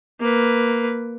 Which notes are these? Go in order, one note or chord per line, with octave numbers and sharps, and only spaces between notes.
A#3 B4